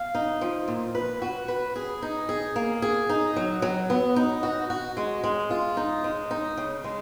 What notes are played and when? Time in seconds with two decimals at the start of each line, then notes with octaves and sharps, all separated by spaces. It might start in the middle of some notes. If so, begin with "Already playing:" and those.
Already playing: F5
0.15 D#4
0.41 F3
0.68 A#2
0.95 B4
1.22 F#4
1.48 B4
1.76 G#4
2.02 D#4
2.29 G#4
2.56 A#3
2.82 G#4
3.09 D#4
3.36 F#3
3.62 F#3
3.90 B3
4.16 D#4
4.43 F#4
4.70 F#4
4.97 G#3
5.24 G#3
5.50 F4
5.77 D#4
6.04 G#3
6.31 D#4
6.57 C#3
6.84 G#3